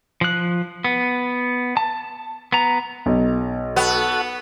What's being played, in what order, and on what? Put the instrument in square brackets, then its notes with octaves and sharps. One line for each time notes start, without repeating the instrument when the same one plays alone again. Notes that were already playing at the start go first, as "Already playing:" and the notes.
[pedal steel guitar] F3 F#6
B3
A5
B3 A#5
[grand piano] B1
[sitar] B3 [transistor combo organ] F#4 A4 F#5